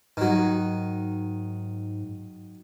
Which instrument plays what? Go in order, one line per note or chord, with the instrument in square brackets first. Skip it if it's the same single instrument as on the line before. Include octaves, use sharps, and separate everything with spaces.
[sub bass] G#2 [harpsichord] D#3 F#3